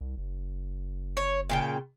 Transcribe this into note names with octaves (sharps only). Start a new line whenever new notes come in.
C2
F#1
C#5
A#2 C#3 G5